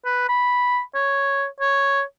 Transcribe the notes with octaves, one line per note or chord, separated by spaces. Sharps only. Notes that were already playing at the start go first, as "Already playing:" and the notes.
B4
B5
C#5
C#5